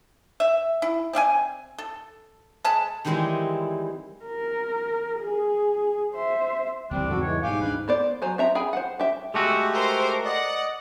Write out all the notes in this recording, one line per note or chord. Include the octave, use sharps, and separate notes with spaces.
E5
E4
C4 D5 E5 G#5
A4
G#3 A4 A5 B5
D#3 E3 G3 G#3 C4 E4
A#4
G#4
C5 E5
D2 D#3 E3 G3 C4 D4
E2 G#2 C#3 F#4 A4
E3 G#3 C#5
G#2 B2 G3 G4 F5 G#5
D2 E3 D4 B4
B3 C5 D5
F#3 C5 G#5
C4 E5 A#5
G#4 G5 G#5 B5
C5 F#5
G4 E5
G#3 A3 F#4 G4 A4
A#4 C5
D5 D#5 F#5